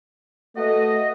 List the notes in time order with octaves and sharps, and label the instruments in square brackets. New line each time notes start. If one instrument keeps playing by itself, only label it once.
[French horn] A3 [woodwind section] F#4 B4 D#5